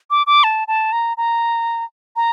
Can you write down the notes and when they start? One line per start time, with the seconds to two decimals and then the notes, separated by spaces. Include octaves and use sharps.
0.11 D6
0.27 D6
0.44 A5
0.68 A5
0.92 A#5
1.17 A#5
2.16 A#5